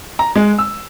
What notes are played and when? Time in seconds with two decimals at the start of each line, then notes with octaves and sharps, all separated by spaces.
0.19 A#5
0.35 G#3
0.59 E6